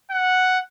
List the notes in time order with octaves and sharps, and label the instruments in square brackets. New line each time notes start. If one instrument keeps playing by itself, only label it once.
[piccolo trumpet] F#5